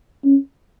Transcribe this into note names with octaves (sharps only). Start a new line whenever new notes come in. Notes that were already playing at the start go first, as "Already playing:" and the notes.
C#4